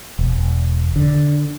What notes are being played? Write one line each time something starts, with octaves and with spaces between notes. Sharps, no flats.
E1
D3